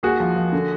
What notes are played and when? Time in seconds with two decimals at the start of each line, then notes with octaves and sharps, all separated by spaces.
0.03 D#2 F#4 G#4
0.20 F3
0.36 F3
0.53 D3